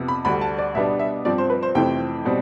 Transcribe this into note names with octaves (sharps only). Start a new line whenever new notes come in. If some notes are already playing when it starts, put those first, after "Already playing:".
Already playing: F2 C3 B3
B5
D2 D3 G3 B5
A5
D5
B2 G3 B3 D4 E5
E5
G2 F3 C4 D5
C5
B4
C5
F2 C3 E3 A3 C4 G5
B2 G3 C4